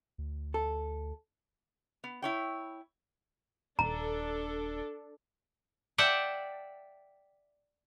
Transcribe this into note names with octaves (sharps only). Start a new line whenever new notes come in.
D2
A4
B3
E4 C#5 G5
D#1 D4 A4 A#5
D5 E5 F#5 G5 A5